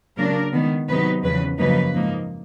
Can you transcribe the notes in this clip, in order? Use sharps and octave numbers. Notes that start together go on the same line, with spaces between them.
C#3 F#3 A#3 D4 A#4
D#3 G#3 B3
C3 D#3 F#3 B3 D#4 B4
E2 C#3 F3 B4
F#2 C#3 F3 A#3 D#4 B4
G#2 F3 A#3 D#4